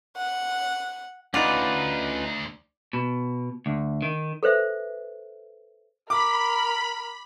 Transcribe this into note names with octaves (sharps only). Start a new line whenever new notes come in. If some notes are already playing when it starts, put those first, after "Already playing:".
F#5
D2 C#4 D#4 F4 B4 D5 F#5
B2
D2
D#3
A4 B4 C5 E5
A#4 B5 D6